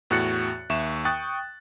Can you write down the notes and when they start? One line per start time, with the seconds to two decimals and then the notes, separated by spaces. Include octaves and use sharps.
0.10 E2 A2 F#4 F#6 A6 C#7
0.70 D#2 E5 C#6 E7
1.05 G5 C#6 D#6 F#6 A6